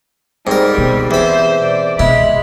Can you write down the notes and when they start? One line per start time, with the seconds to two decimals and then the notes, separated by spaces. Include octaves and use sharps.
0.47 G#2 G3 C4 A#4
0.78 B2
1.11 E2 C5 B5
1.61 D5
1.99 B2 G#3 E4 B5